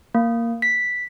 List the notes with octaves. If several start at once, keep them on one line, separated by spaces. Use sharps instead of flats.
A#3
B6